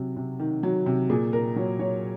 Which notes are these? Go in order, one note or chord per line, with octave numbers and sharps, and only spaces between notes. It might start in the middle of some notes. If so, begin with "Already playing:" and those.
Already playing: C3 F#3
C3
D#3
F#3
C3
A#2 G#4
A#2 A#4
F#3 C#5
F#3 C#5